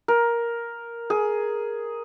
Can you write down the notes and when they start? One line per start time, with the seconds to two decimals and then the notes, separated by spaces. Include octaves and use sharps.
0.08 A#4
1.10 G#4